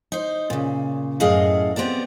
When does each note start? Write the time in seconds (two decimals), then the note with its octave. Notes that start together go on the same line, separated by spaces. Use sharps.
0.12 D#4 C5
0.50 A#2 C#3
1.20 F#2 A2 G#4 D#5 F5 F#5
1.76 B3 C4 G4 A4 D5